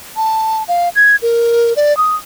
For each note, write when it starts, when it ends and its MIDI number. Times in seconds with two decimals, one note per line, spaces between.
0.16 0.63 81
0.68 0.89 77
0.96 1.16 92
1.22 1.73 70
1.76 1.96 74
1.97 2.15 87